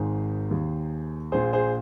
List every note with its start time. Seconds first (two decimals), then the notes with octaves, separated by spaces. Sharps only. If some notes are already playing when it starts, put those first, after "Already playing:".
Already playing: G#1 G#2 D#3 G#4 C5
0.51 D#2 D#3
1.32 A#1 A#2 G#4 C5
1.53 G#4 C5